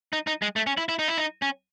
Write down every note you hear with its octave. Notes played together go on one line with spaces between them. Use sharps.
D#4
D#4
G#3
A3
C#4
E4
E4
D#4
E4
D#4
C#4